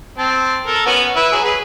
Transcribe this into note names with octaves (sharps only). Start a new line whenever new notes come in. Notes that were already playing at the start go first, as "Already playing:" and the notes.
C4 A5
A4 A#4
B3 C#4 F#4
E4 B4 E5
F#3 G#4
G#4 B4